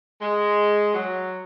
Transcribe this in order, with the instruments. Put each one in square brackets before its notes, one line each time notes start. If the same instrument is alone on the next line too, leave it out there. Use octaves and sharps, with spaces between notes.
[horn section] G#3
F#3